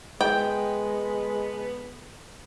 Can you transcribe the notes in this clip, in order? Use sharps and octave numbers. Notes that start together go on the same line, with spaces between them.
D3 G#3 B3 G5